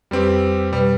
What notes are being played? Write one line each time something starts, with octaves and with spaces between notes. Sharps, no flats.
F2 G3 C4 G4 B4
B2 G3 B4